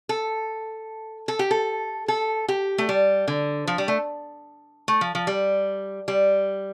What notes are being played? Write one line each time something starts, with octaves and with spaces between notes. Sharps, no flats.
A4
A4
G4
A4
A4
G4
A3
G3
D3
F3
G3
A3
A3
F3
F3
G3
G3